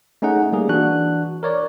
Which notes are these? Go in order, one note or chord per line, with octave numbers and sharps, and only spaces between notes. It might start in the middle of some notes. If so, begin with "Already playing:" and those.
A3 C#4 D#4 G#4 F#5
G3 A#3 G#4
E3 D4 F#4 F#6
A#4 C#5 D5